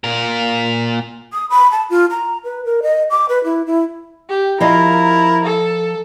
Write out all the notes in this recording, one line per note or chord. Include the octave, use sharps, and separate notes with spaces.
A#2 A#4
D#6
B5
A5
F4
A#5
B4
A#4
D#5
D6
B4
E4
E4
G4
F3 E4 A#4 D#5 F5
A4